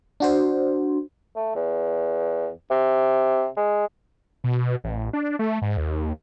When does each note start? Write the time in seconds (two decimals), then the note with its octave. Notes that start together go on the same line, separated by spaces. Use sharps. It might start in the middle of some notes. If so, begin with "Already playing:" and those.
0.20 D4 F#4 C5
1.36 A3
1.55 E2
2.70 C3
3.57 G#3
4.44 B2
4.84 A1
5.13 D4
5.39 A3
5.62 G#2
5.77 D#2